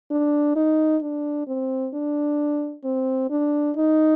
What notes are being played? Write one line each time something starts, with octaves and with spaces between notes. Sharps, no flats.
D4
D#4
D4
C4
D4
C4
D4
D#4